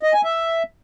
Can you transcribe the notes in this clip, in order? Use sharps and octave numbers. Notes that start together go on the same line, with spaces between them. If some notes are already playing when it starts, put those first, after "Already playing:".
D#5
G#5
E5